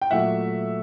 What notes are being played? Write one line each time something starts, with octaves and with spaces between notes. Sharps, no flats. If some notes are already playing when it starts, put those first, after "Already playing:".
G5
A#2 F#3 A3 E5 F#5